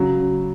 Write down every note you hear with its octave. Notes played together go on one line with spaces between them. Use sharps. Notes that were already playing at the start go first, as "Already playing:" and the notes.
Already playing: C#3 F#3